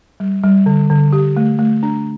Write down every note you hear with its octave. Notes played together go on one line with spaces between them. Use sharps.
G3
G3
D3
D3
G4
A3
A3
D4